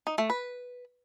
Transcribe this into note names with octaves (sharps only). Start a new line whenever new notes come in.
D#4
A3
B4